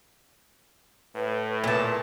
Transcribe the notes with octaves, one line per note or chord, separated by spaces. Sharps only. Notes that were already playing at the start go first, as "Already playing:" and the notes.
A2 B4
A#2 A5